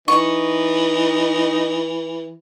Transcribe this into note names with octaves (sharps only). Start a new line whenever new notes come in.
E3 D#4 C#6